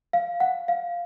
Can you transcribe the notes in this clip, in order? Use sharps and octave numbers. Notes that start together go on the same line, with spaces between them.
F5
F#5
F5